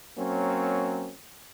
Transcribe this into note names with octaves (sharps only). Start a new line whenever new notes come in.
F#3 A#3 C4 C#4